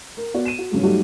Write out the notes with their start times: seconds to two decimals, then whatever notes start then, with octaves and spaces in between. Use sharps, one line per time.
0.17 A#4
0.34 B3 F#4 D5
0.45 D#7 E7
0.59 F#4
0.71 G2 C#3 F#3 G#3
0.83 F#3 G3 A3 D#4 F#4 G4